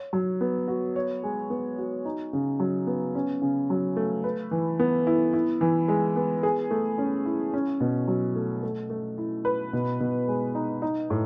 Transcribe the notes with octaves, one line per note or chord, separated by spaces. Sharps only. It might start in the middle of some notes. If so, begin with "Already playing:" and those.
Already playing: C#5
F#3
B3
F#4
C#5
G#3
B3
F#4
D#4
C#3
F#3
B3
C#4
C#3
F#3
A3
B4
E3
B3
E4
E4
E3
G#3
B3
G#4
A3
C#4
E4
C#4
B2
F#3
A3
A3
A3
E4
B4
B2
B2
G#3
D#4
D#4
A2